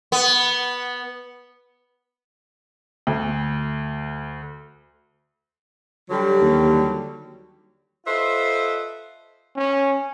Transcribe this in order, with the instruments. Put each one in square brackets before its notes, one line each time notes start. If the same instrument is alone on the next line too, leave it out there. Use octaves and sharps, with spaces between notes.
[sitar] B3
[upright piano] D2
[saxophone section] D3 F#3 G3
[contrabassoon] D#2
[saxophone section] F4 A4 B4 C5 D#5 E5
[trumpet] C#4